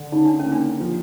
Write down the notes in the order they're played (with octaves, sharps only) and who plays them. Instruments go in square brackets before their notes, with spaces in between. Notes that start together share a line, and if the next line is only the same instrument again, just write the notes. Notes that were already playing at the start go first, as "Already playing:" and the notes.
Already playing: [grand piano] D3
[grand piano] C#3 [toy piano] D#4
[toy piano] D4
C#4
[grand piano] A#3
[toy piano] D4
[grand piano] F3